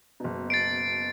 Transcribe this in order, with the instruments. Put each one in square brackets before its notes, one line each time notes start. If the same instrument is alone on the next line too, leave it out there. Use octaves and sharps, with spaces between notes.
[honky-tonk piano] F#1 B2
[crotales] A6 C7 D7